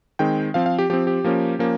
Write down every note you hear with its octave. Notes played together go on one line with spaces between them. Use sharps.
D#3 G#3 C4 G5
F3 C4 F5
F5
G4
F3 C4 G4
G4
F3 A#3 C#4
F3 A#3 C#4